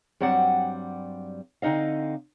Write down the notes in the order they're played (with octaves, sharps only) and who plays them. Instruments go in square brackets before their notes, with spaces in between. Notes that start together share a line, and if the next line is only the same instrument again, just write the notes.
[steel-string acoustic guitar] G2 F#3 G3 C4 D5 F#5
D3 C4 D#4 D#5 F5